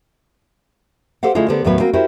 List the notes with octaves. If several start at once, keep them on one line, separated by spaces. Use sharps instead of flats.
G4 A4 C5 F5 F#5
D3 G#3 A3 E4 F4 A4
D3 B3 G4 A#4 C5
D#2 A2 F#3 B3 B4
A#3 C4 F#4 A#4
E4 F#4 G4 A4 A#4 C5